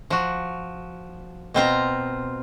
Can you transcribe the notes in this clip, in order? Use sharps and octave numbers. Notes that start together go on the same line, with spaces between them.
F3 F#4
B2 C4 F4 A#5